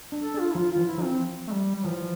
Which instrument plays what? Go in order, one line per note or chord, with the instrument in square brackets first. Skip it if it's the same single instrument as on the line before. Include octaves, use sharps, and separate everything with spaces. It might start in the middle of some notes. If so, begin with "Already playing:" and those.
[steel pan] D4
[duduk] A4
[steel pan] D4
[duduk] F4
E4
[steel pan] F3 [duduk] F4
[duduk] F4
[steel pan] E3
[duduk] E4
[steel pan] F3
[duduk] C4
A3
G3
G3
[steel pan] E3 [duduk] F3